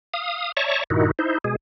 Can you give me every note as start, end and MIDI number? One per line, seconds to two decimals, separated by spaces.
0.14 0.52 77
0.14 0.52 87
0.57 0.83 73
0.57 0.83 74
0.57 0.83 76
0.57 0.83 81
0.57 0.83 82
0.57 0.83 85
0.90 1.11 43
0.90 1.11 46
0.90 1.11 51
0.90 1.11 63
0.90 1.11 64
0.90 1.11 66
1.19 1.38 63
1.19 1.38 64
1.19 1.38 72
1.44 1.56 47
1.44 1.56 56
1.44 1.56 68